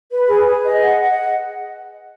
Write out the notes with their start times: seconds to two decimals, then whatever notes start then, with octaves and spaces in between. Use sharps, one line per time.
0.10 B4
0.27 G#4
0.46 G#4
0.65 D#5
0.82 F#5
1.00 F#5